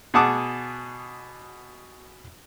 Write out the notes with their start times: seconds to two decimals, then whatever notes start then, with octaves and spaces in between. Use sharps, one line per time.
0.14 B2 G#4 F#5 A5 D6 D#6